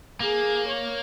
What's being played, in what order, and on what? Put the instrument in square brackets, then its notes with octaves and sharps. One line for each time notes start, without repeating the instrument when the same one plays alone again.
[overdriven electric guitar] A#3 [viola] G#4
[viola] C#5